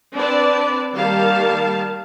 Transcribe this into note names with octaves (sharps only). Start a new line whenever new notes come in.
C4 D4 B4 D5 A5
D#3 G3 A#3 F5 A5